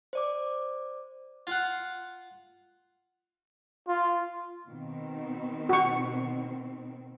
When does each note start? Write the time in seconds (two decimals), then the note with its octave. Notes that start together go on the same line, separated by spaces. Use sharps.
0.13 C5 D5 D6
1.47 F4 F5 F#5
3.88 F4
4.67 B2 D#3 C4
5.69 F#4 C#6